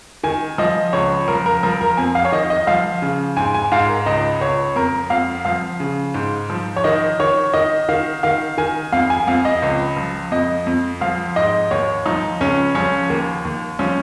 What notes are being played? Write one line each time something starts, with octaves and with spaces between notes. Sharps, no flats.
D#3 G#5
F3 D#5
C#2 C#5
F3 A#4
A#4
F3 A#4
A#4
F2 G#5
F5
C#5
D#3 D#5
D#5
F3 F5
C#3
G#2 G#5
G#5
G#2 F5
A#4
C#2 D#5
C#2 C#5
F2 A#4
F2 F5
F3 F5
C#3
G#2
F3
C#5
D#3 D#5
D#3 C#5
D#3 D#5
D#3 F5
D#3 F5
D#3 G#5
F2 F5
G#5
F2 F5
D#5
C#2
F3
F2 D#5
F2
F3 F5
G#2 D#5
D#2 C#5
F3 D#4
C#2 C#4
F3 C#4
D#2 A#3
D#2
F3 C#4